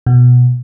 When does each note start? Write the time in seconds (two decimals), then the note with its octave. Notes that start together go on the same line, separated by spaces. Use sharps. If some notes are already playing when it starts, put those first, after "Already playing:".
0.06 B2